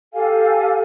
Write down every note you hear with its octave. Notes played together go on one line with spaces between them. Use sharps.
G4 A4 F5 G#5